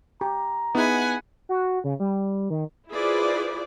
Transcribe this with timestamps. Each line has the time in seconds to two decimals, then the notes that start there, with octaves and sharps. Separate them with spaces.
0.21 G4 A#5
0.75 B3 D#4 E4 G#4 F#5 G#5 B5
1.49 F#4
1.84 C#3
2.00 G3
2.50 D#3
2.91 E4 F4 G#4 B4 C5 D5